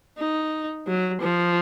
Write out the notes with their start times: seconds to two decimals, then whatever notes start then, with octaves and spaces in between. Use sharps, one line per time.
0.18 D#4
0.87 F#3
1.21 F3